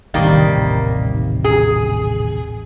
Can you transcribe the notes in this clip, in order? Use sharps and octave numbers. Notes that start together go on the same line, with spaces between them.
D#1 A1 C3 D#3 G3 A#3
G#4